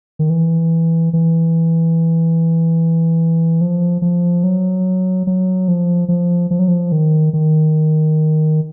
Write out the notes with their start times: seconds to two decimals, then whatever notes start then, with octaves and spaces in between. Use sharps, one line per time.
0.19 D#3
0.30 E3
1.13 E3
3.61 F3
4.02 F3
4.44 F#3
5.27 F#3
5.68 F3
6.08 F3
6.51 F3
6.59 F#3
6.68 F3
6.92 D#3
7.33 D#3